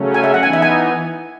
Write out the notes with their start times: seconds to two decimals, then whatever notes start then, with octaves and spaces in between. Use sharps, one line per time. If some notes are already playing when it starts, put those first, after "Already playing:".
Already playing: C#3 F#3 A3 C#4
0.14 G#5
0.24 E5
0.34 F#5
0.43 E3 B3 D#4 G#5
0.53 E5
0.62 G#5